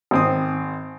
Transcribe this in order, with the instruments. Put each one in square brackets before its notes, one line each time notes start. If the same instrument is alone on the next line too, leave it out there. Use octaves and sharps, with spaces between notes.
[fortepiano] G#1 C4 D#6